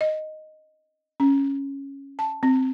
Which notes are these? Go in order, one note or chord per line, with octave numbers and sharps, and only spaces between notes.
D#5
C#4
A5
C4